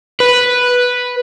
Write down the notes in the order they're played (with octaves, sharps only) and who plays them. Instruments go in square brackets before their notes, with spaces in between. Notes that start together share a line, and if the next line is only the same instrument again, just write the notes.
[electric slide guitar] B4